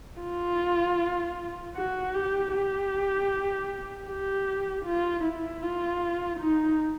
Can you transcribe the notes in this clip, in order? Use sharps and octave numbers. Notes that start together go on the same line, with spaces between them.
F4
F#4
G4
G4
G4
F4
E4
F4
D#4